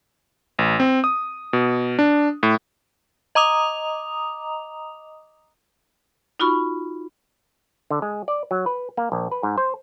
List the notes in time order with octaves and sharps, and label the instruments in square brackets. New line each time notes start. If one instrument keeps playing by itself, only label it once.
[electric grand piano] A1
C4
D#6
B2
D4
A2
[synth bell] D#5 A#5 D6 D#6 F7
[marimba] D#4 F4 F#4 B5 C#6
[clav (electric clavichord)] D3
G#3
D5
F#3
B4
A#3
A#1
B4
G#2
C5